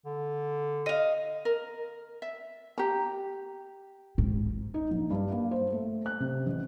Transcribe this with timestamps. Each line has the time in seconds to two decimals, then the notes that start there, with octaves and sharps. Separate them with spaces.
0.05 D3
0.86 D#5 F5
1.45 A#4
2.22 E5
2.78 G4 A#5
4.18 G#2
4.74 D#4
4.91 A#1
5.11 G2
5.32 A#3
5.51 C5
5.72 A3
6.06 F#6
6.20 C3
6.46 A1